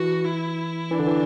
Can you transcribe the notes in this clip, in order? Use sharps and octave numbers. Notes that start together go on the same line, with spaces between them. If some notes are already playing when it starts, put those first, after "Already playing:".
Already playing: E3 F#4
E4
E3 D4
D3
E3